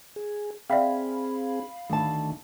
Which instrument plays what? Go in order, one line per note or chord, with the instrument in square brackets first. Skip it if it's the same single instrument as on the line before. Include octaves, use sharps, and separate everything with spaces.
[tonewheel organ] G#4
[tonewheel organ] C4 G#4 [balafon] D5 E5 G5 [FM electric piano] F5 B5
[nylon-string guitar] D2 A5 [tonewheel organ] D#3 A3